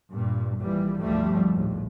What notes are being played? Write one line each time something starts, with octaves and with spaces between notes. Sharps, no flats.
G2 A#2
A#1 A#2 E3 G3
G1 D2 G#2 F3 G3 A3
A#1 D#2 A2